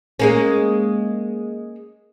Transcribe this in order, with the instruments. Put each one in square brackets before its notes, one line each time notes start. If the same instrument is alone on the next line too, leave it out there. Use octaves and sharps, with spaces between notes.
[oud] G#3 A#3 C#4